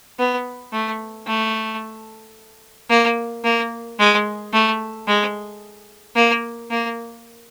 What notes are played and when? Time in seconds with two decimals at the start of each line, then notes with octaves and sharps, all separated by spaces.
0.19 B3
0.73 A3
1.27 A3
2.90 A#3
3.44 A#3
3.99 G#3
4.53 A3
5.07 G#3
6.16 A#3
6.70 A#3